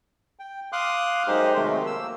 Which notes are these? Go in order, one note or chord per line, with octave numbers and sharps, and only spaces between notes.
G5
F5 C6 D6 D#6 F#6
F#2 G#3 D#4 G4 C5
C3 D#3 F#3 G#3 A3
A#3 E6